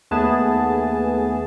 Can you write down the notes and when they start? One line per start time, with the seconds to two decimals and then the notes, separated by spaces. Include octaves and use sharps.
0.11 D#2 A3 B3 G#4 A5